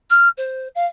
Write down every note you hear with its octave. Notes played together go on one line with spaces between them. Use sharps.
F6
C5
F5